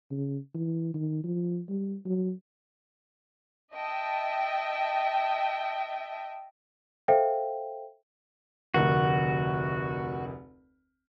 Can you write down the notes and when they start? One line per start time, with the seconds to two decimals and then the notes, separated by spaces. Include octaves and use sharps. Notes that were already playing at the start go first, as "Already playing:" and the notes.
0.11 C#3
0.55 E3
0.94 D#3
1.24 F3
1.69 G3
2.06 F#3
3.75 D#5 E5 G5 A5
7.08 A4 C5 E5 F5 G5
8.74 F1 D2 F#4 A#4